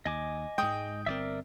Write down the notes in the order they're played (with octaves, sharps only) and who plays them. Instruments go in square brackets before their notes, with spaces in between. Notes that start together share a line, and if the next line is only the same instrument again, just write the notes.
[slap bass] D#2 [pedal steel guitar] D#5 G#5 D6
[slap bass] G#2 G#3 [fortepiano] G5 D#6
[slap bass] G1 B2 C4 [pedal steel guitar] A#4 D5 E5